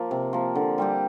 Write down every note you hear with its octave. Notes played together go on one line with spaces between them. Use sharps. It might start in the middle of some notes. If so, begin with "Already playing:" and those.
Already playing: F3 A#3
C3
F3 A#3
D3
G3 C4 G4